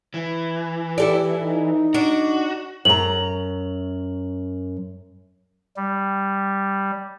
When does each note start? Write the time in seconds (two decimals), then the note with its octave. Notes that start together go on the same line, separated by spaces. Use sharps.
0.14 E3
0.98 E4 G4 A4 D5
1.43 D#4
1.94 D4 F#4
2.85 F#2 A#5 F#7
5.77 G3